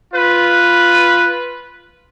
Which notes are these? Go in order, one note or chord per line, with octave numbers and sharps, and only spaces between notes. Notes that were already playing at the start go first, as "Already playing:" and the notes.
F4 B4